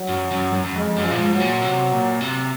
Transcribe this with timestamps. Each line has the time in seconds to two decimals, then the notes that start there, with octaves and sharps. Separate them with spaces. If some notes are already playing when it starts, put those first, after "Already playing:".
Already playing: F#3
0.08 F#2
0.31 F#2
0.53 F#2
0.64 F#2
0.75 F2 G#3
0.96 F#2
1.04 F3
1.11 A#2
1.18 G#2
1.33 G#2 F#3
1.40 A#2
1.62 C3
1.91 A#2
2.21 C3